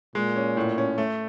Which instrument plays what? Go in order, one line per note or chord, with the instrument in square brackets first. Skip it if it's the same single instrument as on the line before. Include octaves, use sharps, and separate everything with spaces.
[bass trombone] A#2 [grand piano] G#3
[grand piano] C#4
A2
C#4
A3